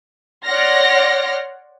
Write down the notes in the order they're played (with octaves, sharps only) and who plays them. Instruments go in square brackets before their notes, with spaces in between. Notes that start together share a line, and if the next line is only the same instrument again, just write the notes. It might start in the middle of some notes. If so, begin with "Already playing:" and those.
[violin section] C#5 D5 F#5 C6 F6 A#6